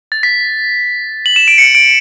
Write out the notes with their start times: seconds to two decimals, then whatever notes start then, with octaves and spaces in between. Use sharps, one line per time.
0.12 A6
0.23 B6
1.26 F#7
1.36 E7
1.48 D7
1.58 C#7
1.75 D7